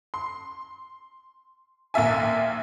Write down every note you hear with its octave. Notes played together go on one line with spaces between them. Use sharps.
C6
A#1 D#2 F4 E5 G#5